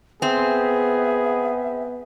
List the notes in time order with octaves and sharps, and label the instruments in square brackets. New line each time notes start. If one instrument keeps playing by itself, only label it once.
[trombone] B3 [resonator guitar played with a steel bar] C4 [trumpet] G#4 [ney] E5